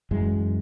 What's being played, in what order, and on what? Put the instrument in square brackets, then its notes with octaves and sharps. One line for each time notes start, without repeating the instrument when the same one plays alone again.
[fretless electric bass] F#2 E3 G#3